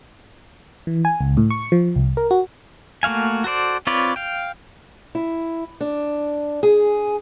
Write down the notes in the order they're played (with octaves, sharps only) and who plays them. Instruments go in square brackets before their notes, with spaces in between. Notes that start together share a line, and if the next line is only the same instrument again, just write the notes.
[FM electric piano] E3
G#5
C#2
A2
C#6
F3
C2
A#4
F#4
[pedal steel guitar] A3 A#3 F#4 F5 G#5
F#4 A4 C5 D5
C4 F4 B4 C#5 D5
F5 G5
[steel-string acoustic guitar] E4
D4
G#4